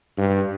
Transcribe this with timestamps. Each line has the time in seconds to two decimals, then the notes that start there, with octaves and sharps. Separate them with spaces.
0.18 G2